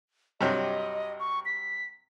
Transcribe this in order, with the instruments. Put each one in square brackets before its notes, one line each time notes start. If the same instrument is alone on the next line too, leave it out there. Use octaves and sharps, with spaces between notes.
[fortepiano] G2 C3 F#3 [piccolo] D#5
[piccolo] C#6
B6